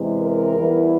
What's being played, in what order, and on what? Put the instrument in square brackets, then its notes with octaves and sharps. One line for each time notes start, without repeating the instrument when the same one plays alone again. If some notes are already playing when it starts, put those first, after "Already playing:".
Already playing: [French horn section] E2 C3 E3 G#3
A#4
E2 E3 G3